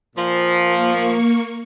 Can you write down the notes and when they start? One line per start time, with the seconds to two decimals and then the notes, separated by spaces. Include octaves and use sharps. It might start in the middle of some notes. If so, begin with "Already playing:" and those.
0.16 A#2 F3
0.63 A#3 C#6